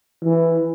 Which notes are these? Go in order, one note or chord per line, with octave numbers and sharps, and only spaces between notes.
E3